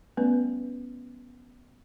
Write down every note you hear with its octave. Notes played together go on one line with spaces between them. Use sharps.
G3 A3 B3 C#4 B4 D5